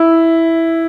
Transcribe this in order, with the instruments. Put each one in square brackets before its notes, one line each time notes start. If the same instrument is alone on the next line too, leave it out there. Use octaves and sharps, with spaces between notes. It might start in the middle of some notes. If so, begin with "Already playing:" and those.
Already playing: [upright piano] E4